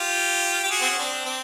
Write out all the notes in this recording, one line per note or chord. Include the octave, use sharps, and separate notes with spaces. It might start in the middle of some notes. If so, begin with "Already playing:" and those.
Already playing: F4 G4
G4
F#4 G#4
C4
C#4
C4 D4
C4